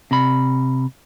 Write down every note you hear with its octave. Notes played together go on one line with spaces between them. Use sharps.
C3 B5